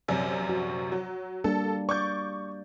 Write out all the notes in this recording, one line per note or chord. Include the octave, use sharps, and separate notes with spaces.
A#1 F#2 C3
F#4
F#3
G3 A#3 D4 A4
D5 C#6 D6 G6